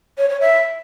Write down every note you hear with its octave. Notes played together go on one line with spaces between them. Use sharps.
C#5
C#5
E5